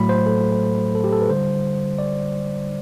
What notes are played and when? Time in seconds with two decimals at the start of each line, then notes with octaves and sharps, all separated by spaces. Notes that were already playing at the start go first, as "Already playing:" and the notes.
Already playing: A2 F#3 A3 B5
0.09 C5
0.26 A4
0.95 A4
1.04 G4
1.12 A4
1.21 B4
1.30 D3 G3 C5
1.99 D5